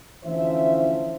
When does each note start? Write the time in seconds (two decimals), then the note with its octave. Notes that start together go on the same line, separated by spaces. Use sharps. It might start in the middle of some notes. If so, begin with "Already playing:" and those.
0.24 D2 E3 F3 C#4 C5 E5